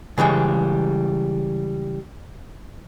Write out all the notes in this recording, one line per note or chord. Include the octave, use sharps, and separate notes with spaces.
C#3 E3 G3 G#3